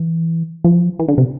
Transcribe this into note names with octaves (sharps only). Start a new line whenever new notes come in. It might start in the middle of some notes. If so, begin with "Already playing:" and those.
Already playing: E3
F3
E3
D3
C3